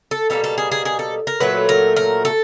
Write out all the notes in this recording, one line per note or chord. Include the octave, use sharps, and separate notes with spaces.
A4
B2 G3 A#3 A4
A4
G#4
G#4
G#4
A4
A#4
A#2 F#3 A3 B4
A#4
A#4
A4